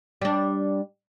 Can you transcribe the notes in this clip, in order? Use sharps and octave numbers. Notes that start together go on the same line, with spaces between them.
G3 D4